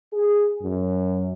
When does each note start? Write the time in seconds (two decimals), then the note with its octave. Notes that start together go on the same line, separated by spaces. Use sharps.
0.13 G#4
0.62 F#2